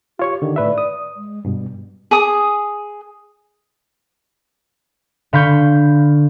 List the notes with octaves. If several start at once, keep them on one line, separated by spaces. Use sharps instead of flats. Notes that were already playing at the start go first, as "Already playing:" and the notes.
F4 G4 C#5 C#6
D3 D#3
A2 B4 D5 E5
D#6
G#3
G2 B2 G3
G#4 G#5 D#6
D3 F5 B5 C#6 G6